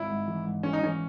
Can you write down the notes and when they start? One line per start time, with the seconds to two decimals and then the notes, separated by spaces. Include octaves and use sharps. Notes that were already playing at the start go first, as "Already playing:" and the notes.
Already playing: G#1 E4
0.09 G#2
0.28 E3
0.45 G#2
0.63 E3 C#4
0.73 D#4
0.81 E3 C#4